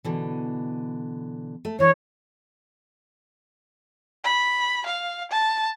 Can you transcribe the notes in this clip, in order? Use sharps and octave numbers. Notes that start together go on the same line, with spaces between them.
B2 D3 E3
A3
E3 D4 C#5
B5
F5
A5